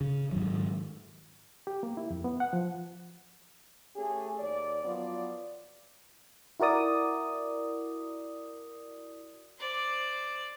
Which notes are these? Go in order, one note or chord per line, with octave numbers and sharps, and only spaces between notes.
C#3
G#2 D#3 F#3
G4
A#3
E4
F2
B3
F#5
F3
A3 C#4 G4 G#4
D#2 C#5 D5
F3 F#3 B3 F4 D5
E4 F#4 A#4 D5 D#6
C5 D5